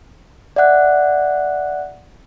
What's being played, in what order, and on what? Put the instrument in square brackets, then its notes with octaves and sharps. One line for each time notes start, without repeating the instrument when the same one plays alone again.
[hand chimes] D5 E5 F#5 F#6